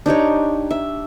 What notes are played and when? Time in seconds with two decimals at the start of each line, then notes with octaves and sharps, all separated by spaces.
0.06 D4 D#4 G4 C#5
0.71 E5